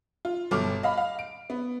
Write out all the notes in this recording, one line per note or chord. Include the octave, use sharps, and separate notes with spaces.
F4
G1 B2 A4 D6 F6
D#5 F5 B5
F5
D7
B3